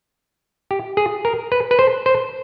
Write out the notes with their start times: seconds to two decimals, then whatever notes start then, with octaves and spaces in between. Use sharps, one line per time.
0.71 G4
0.97 G#4
1.25 A#4
1.52 B4
1.71 B4
1.79 C5
2.06 C5